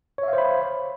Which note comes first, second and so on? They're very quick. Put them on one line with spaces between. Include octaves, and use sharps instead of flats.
C#5 E5 F5 C5 B5